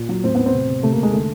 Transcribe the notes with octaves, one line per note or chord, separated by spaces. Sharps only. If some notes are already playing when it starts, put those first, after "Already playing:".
Already playing: A#2
F#3
A2 C4
A2 B3
C4
C3
C3
C3 A3
A#3
C3
G#3
D3 A3